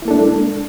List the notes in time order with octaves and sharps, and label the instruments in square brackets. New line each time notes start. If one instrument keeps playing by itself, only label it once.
[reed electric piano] E4
A#3
A4
D4
G#3